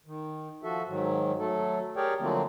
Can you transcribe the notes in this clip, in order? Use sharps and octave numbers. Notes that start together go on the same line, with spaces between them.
D#3
F3 F#4 A4 E5
G#2 D#3 F#3
F#3 A3 A4
G4 G#4 A#4 C#5 D5 G5
D3 F3 F#3 A3 A#3 C4